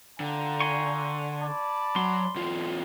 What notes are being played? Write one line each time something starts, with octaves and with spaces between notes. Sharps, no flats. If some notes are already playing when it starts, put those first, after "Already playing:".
D3 F4 G5 A#5
G#5 C6 C#6
D5 A5 B5
F#3 C6
E2 F4